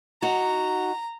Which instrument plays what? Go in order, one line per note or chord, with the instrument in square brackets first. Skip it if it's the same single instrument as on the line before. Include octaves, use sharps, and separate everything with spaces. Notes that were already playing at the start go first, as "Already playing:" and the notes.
[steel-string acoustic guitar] D#4 F#4 [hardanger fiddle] A#5